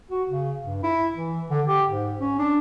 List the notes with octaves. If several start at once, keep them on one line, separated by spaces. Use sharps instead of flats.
F#4
C#3
G2
E4
E3
D3
G4
G#2
C#4
D4